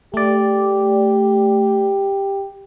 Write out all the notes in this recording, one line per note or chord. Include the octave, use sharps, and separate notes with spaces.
A3 G4 D5